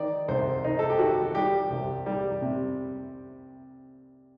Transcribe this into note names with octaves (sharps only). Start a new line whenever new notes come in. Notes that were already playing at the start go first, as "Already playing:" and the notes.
Already playing: D#3 D5
C2 C5
C2 D#4
A4
G4
D#3 F#4
G3 G4
C2
G3
C3